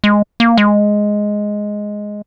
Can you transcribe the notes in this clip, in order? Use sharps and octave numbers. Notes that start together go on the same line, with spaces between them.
G#3
A#3
G#3